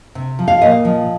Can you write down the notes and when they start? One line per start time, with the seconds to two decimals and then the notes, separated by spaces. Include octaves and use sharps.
0.15 C3
0.39 F3
0.48 F5
0.61 A#2 D#5
0.85 F3